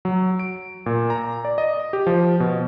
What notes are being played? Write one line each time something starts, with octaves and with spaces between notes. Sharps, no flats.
F#3
D7
A#2
A#5
D5
D#5
G4
F3
B2